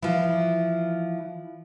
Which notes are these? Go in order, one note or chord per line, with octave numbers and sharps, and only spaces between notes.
E3 F3